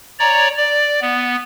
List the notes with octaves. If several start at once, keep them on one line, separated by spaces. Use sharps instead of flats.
C#5 D5 A#5
D5
B3